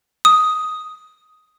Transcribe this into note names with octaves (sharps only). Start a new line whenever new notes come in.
D#6